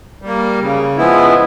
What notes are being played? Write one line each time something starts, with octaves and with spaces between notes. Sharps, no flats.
G3
A#3
C#3
F3 G#3 B3 E4